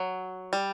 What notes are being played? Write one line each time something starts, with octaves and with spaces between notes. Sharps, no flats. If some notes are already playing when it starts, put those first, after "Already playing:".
Already playing: F#3
G3